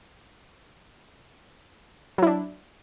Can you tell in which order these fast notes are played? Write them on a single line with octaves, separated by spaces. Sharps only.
F#3 E4 D4